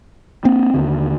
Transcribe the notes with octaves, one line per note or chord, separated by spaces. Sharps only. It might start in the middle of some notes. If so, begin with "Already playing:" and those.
A#3 C4
D#2 D3